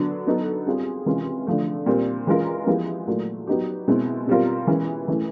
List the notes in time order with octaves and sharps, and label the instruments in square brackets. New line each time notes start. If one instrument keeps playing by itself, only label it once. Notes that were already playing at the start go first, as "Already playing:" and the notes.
Already playing: [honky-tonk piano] D3 F#3 B3 D4
F#3 B3 D#4 F#4 A4
G3 C4 F4 G#4
C3 E3 G#3 C#4 F4
D3 F3 A3
A#2 G3 C4
E3 G#3 C#4 F4 A#4
F3 G#3 B3 E4 G4
A#2 F#3 A3
F#3 B3 D#4 G4
B2 G#3 C4 E4
B2 G3 C4 F4 A#4
E3 G#3 C#4 E4
E3 A3 C#4 E4